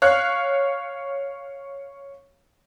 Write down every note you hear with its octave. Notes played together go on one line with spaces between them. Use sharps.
C#5 F5 F#6